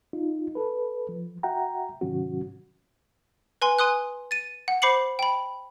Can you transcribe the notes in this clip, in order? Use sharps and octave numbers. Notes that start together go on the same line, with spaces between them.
D#4 F4
A4 B4
F3
F#4 E5 F#5 G5 A#5
G#2 C3 D#3 F#3 C#4 F#4
B4 G#5 C6
G#5 C6 D#6 F#6
A6 D#7
F#5
C5 B5 D6 C7 C#7 F#7
G5 B5